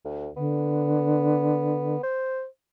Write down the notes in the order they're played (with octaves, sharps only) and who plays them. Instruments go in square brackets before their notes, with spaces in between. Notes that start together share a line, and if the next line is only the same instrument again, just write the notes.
[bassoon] D2
[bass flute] D3 [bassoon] B3
[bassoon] C5